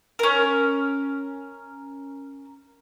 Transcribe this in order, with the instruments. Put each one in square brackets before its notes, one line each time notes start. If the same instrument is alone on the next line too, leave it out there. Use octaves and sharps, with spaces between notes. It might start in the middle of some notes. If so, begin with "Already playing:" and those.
[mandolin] C#4 A#4